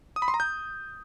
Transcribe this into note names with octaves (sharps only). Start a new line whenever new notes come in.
D#6
B5
C6
A#5
G6